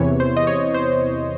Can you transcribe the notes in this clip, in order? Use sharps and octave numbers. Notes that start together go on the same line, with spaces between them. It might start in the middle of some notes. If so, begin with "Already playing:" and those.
Already playing: E2 C3 E3 C#5
C5
D#5
C#5
C5